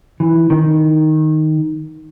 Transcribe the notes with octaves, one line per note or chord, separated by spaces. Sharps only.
E3
D#3